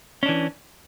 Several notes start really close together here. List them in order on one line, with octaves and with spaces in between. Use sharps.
C#4 D4 E3